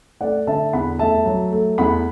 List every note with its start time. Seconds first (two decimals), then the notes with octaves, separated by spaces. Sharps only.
0.21 A3 D5 F#5
0.47 D3 E5 A5
0.73 E2 F#5 B5
0.99 A3 E5 A5
1.26 F#3
1.52 A3
1.78 E2 F#5 B5